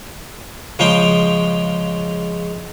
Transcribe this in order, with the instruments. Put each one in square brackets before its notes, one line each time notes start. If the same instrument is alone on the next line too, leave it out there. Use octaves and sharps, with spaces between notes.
[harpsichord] C#3 F3 G#3 F5 G5